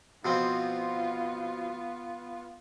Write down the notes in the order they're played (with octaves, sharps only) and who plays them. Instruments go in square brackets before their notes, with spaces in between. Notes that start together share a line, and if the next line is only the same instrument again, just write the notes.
[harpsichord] B2 F3 C4 [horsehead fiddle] B3 F4